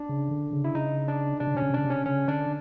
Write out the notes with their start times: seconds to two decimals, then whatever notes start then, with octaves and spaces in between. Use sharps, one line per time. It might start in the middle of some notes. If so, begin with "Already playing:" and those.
Already playing: D4
0.09 C#3
0.31 D3
0.53 C#3
0.64 E4
0.75 C#3 D#4
1.08 D4
1.40 C3 D4
1.47 C#3
1.55 C3 C#4
1.62 C#3
1.70 C3
1.74 C#3 D4
1.85 C3
1.90 C#4
2.06 C#3 C#4
2.28 D3 D4